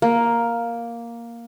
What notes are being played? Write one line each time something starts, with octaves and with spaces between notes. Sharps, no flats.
A#3